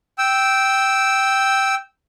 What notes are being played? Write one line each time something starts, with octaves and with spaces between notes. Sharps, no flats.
G5 E6